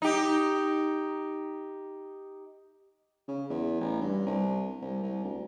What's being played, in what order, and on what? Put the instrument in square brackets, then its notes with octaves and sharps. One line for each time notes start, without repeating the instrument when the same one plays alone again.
[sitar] D#4 G4
[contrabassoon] C#3
E2
A1
G2
C2
C2
C2
D2